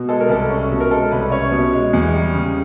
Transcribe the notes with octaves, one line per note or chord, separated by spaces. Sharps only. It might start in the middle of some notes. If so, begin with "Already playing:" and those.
Already playing: B2
G#3 A4
A#4
C2 A4
C#4
B2
A#4
G#3 A4
C2 B4
C#4 C#5
B2
G#3
E2
G3
C#3